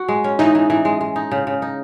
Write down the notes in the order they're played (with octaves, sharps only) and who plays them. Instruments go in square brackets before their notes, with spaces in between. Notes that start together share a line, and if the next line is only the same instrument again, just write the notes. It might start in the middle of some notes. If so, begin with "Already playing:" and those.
Already playing: [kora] F#4
G#3
C#4
[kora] E3 [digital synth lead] D#4
[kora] E3
E3
G#3
G#3
D#4
C#3
C#3
D#4